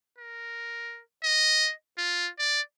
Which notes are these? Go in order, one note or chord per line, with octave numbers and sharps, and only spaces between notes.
A#4
D#5
F4
D5